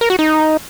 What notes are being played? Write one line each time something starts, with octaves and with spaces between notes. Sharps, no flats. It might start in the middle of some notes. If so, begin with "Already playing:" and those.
A#4
F#4
D#4